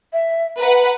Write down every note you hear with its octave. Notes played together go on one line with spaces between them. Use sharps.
E5
B4 F#5 A#5